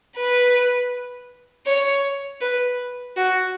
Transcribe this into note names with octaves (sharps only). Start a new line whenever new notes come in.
B4
C#5
B4
F#4